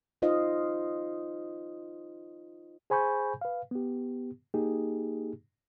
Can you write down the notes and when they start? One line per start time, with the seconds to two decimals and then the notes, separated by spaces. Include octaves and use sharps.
0.22 D#4 F4 C5 D#5 F5
2.90 G#4 C5 G#5 B5 C#6 G6
3.41 B4 F5
3.71 B3 G4
4.54 A#3 D#4 G4 G#4